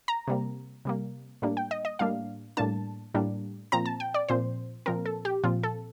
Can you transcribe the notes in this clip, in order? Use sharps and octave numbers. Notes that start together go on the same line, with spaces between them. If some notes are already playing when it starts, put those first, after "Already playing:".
A#5
C3 G3 A#3
C3 G3 A#3
A2 G3 A#3 D4
G5
D#5
D#5
A2 G3 A#3 D4 F5
A2 G3 A#3 D4 A5
A2 G3 A#3 D4
A#2 F3 C4 A#5
A5
G5
D5
A#2 F3 C4 C5
A#2 F3 C4 A#4
A4
G4
A#2 F3 C4 F4
A4